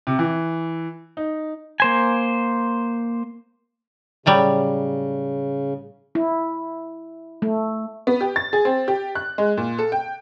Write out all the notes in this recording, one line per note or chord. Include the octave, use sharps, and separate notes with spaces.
C3
E3
D#4
A#3 C5 G#5
A2 C#3 F#3 G3
E4
A3
B3
G4
A6
G#4
C4
G4
F#6
G#3
A#2
A4
G5